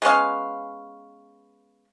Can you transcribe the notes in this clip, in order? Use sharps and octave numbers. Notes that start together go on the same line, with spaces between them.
G#3 B3 C#4 F5